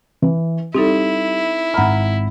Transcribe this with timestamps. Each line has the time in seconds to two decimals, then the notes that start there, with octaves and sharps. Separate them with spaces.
0.22 E3
0.74 G3 C4 D#4 E4 A4
1.74 G#1 F#5 A#5 B5 F6